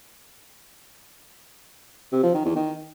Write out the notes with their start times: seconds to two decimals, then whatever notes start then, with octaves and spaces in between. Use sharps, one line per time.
2.12 C3
2.23 F3
2.34 D#3
2.45 E2
2.56 D#3